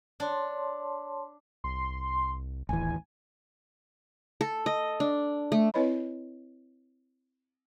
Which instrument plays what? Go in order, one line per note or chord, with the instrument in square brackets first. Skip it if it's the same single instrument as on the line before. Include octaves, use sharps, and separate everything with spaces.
[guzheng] D4 [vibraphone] C#5 A5 C6
[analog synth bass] C2 [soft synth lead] C6
[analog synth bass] D1 [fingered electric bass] A1 D#2 E3 [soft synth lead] G#5
[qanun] A4
D#5
D4
A3
[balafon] C4 E4 B4 C#5 D#5 B5